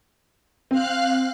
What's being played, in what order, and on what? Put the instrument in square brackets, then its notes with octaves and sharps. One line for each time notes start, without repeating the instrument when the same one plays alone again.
[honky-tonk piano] C4 [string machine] F5 F6 F#6